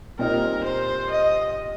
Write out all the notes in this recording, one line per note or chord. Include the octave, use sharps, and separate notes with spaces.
A#2 G3 C4 D#4 A#4
C5
D#5